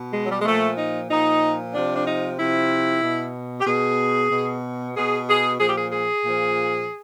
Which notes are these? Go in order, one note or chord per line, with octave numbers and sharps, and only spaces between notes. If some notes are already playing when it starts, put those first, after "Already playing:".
Already playing: B2
G#3
F#3
G3
G#3
A#2 F3 A3
D#4
A#2 F3 D#4
C3 F3 D4
D4
D#4
C3 F3 E4
B2
G4
B2 G#4
B2
B2 G#4
G#4
A#2 F3 G#4
G4
G#4
G#4
A#2 F3